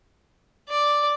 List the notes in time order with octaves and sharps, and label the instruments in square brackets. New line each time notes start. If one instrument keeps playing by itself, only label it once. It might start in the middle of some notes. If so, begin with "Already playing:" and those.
[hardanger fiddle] D5